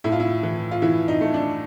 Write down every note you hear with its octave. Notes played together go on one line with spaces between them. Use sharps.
A2 E4
F4
E4
E3
F4
E3 E4
D#4
A3
D4